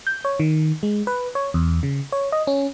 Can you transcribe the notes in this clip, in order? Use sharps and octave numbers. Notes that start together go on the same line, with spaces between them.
G6
C#5
D#3
G#3
B4
C#5
E2
C#3
C#5
D#5
C#4